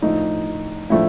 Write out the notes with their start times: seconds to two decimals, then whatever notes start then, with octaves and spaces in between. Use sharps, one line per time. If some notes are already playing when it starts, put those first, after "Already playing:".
0.02 A2 F3 A3 D4 D#4
0.90 A2 F3 A3 D4 E4